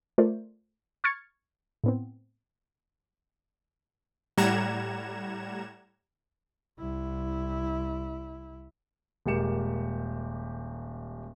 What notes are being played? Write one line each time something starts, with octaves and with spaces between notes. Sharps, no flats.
A3 F4 A#4 C5 D5
C#6 F6 G#6 A6 C#7
A2 B3 C4
A2 G3 F#5 A#5 G#6 E7
C2 E4
D#1 G#3 A#3 G4 C#7 E7